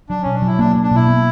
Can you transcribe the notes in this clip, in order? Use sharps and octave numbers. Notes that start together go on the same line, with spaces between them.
F#3 D4
B2 C#4
D4
F#3 E4
A#3 D4
A#3
D4
B2 E4
B3